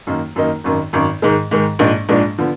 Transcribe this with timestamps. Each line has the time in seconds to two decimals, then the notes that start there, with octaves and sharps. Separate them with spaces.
0.07 F#2 D#3 A#3 D#4
0.36 F#2 D#3 A#3 D#4
0.64 G#1 F#2 D#3
0.93 G#1 F#2 D#3
1.22 G#2 D#3 G#3
1.51 G#2 D#3 G#3
1.79 A#1 G#2 F3 G#3 D4
2.09 A#1 G#2 F3 G#3 D4
2.38 D3 F3 B3